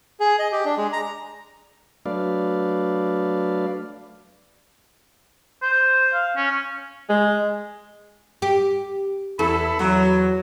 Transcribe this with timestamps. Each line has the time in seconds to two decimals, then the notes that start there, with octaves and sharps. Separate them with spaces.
0.20 G#4
0.39 D#5
0.52 G4
0.65 D4
0.77 G#3
0.93 A#5
2.06 F#3 A3 D4 B4 D5 F5
5.62 C5
6.13 F5
6.37 C#4
7.09 G#3
8.42 G4
9.39 E2 E4 A4 B5
9.79 E2 F#3